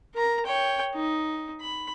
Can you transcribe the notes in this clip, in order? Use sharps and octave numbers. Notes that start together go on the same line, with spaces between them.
A#4 A#5
C#5 G5
D#4
B5